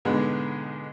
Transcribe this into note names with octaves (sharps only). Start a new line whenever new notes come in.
B1 G#2 D3 G#3 B3